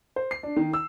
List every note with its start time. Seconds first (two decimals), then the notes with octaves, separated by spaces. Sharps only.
0.16 C5
0.31 C7
0.43 D4
0.56 D#3
0.73 E6